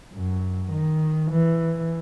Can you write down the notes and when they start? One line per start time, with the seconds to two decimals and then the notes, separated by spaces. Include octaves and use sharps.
0.14 F#2
0.72 D#3
1.31 E3